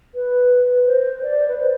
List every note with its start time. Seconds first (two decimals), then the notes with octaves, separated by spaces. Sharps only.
0.15 B4
0.87 C5
1.23 D5
1.48 B4
1.58 C5